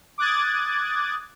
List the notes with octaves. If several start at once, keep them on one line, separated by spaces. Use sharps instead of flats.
D6 D#6 F#6 G#6 A6